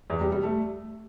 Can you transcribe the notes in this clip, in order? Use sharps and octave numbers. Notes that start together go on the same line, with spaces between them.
E2
G3
G3
A3